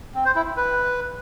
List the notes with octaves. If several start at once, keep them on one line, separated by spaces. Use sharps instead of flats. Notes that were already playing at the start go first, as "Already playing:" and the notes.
C4
C5
E4
E4
B4